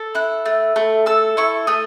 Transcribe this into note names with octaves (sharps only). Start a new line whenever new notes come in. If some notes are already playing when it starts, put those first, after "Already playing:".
Already playing: A4
E4 F#6
A3
A3
A4 E6
E4 C#6
A3 D#6